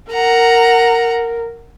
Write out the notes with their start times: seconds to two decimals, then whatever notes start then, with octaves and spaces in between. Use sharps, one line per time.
0.12 A#4 F#5 A#5